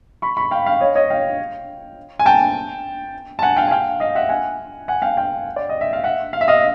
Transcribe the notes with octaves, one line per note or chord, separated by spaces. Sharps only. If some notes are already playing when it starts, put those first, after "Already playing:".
B5 C#6
B5 C#6
F5 G5
F5 G5
C#5 D#5
C#5 D#5
F5 G5
G#5
G5 A5
A5
F#5 G#5
F5 G5
G#5
F5 G5
D#5 F5
E5 F#5
F#5 G#5
F#5 G#5
F5 G5
F5 G5
D5
D#5
E5
F5
E5 F#5
F5
E5
D#5 F5